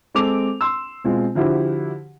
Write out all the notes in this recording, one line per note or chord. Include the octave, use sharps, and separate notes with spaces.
G#3 C4 A4 D6 F7
C6 E6
B2 G#3 C4 F4
D3 F3 E4 F#4 G4